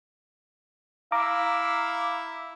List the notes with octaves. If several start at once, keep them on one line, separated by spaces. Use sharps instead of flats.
E4 F5 A#5 D6